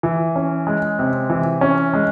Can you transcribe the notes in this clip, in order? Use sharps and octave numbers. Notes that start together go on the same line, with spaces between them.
E3
C#4
G#3
C3
E3
C#4
G#3